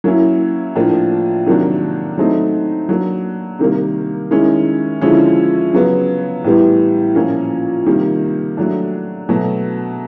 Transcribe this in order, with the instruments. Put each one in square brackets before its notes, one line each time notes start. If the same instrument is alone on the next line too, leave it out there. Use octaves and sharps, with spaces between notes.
[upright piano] F#3 A#3 C#4 E4
A2 F3 A#3 D4
C3 D#3 F#3 A#3 D4
F#3 A3 C4 D#4
F#3 A#3 D4
C3 D#3 G3 A#3
D#3 G#3 C#4 E4
D3 F3 G#3 C#4 E4
C#3 F#3 B3
A2 E3 G3 B3
A#2 F3 A#3 C#4
C3 D#3 G3 A#3
F#3 A3 D4
B2 F#3 A3